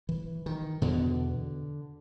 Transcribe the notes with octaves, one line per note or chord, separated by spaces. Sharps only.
E3
D#3
E2 B2 D3